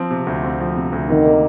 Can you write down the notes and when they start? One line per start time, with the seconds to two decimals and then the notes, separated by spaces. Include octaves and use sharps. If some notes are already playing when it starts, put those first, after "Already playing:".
Already playing: F3 C4
0.11 C3
0.27 D2
0.44 C4
0.60 F3
0.76 C3
0.92 D2
1.09 C3 D#3
1.25 A#3